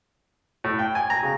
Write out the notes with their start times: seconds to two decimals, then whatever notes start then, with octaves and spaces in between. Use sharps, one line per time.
0.64 A2
0.79 G5
0.95 G#5
1.10 A#5
1.23 C#3